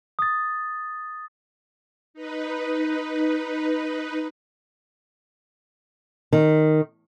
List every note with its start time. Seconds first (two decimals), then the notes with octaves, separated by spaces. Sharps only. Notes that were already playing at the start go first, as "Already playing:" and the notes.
0.19 D#6 A6
2.14 D#4 B4
6.33 D#3